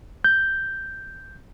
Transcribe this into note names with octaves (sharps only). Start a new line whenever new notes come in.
G6